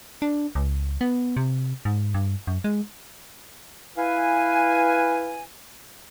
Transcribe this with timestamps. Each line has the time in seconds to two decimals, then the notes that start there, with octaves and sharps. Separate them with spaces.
0.22 D4
0.55 C#2
1.01 B3
1.37 C3
1.85 G#2
2.14 G2
2.47 F#2
2.64 G#3
3.97 E4 B4 F5 G#5